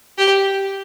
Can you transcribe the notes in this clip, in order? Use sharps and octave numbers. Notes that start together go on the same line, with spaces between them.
G4